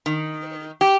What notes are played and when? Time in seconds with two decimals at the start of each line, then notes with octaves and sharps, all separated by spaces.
0.06 D#3
0.81 G4